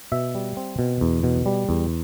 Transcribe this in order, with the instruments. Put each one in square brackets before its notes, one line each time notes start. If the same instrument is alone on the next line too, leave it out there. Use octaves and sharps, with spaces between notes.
[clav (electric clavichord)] B2 E5
G3
C4
B2
E2
B2
G3
E2